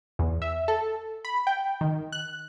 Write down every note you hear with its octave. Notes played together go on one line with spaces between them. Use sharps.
E2
E5
A4
B5
G5
D#3
F#6